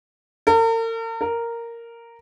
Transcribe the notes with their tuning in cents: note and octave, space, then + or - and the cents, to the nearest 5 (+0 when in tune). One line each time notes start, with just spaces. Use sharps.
A#4 -45
A#4 -5